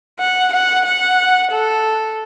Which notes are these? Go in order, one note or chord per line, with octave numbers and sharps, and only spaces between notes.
F#5
F#5
F#5
A4